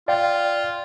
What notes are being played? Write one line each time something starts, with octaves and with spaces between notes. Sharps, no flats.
F4 D5 F5 G5